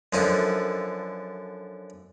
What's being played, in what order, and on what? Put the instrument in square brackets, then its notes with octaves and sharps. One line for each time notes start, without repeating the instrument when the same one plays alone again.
[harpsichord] F#2 D3 F3 D#4 E4 A4